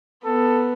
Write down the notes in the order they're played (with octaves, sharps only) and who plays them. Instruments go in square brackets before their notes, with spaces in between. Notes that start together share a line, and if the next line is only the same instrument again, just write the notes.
[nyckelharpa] B3 [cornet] A4